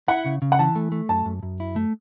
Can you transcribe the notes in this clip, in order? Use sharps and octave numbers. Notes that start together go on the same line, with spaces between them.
E4 F#5
C#3
C#3
F#5
E3 A5
A3
A3
F#2 A5
F#2
F#2
E4
A3